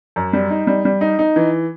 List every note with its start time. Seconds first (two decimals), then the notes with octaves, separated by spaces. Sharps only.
0.16 F#2
0.33 G3
0.50 D#4
0.67 G3
0.85 G3
1.01 D#4
1.19 D#4
1.36 E3